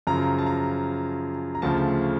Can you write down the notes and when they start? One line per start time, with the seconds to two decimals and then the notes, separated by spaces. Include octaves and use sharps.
0.07 F#2 C#3 F3 A#5
0.39 A5
0.46 A#5
1.55 A#5
1.62 D2 C#3 F3 A5